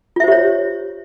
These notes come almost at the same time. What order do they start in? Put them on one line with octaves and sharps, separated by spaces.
F4 E5 C5 G4 C#5